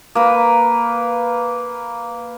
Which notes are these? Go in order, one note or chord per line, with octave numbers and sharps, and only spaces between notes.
A#3 B4